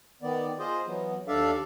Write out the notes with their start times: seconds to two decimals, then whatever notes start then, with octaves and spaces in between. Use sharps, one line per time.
0.22 D#3 B3 D5
0.59 F4 G#4 C5 D#5
0.87 E3 F#3 B3
1.27 D#2 D4 A4 D5 E5 F5